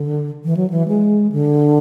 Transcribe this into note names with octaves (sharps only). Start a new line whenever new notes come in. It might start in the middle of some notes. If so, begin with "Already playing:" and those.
Already playing: D3
E3
F#3
E3
G#3
D3